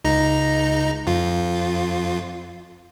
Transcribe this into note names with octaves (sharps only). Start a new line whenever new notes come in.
C#2 D#4 A#5
F2 F4